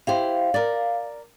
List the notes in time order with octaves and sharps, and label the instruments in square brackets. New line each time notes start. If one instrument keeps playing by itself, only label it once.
[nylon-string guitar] E4 G4 C5 [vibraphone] F5
[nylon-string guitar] A#4 D5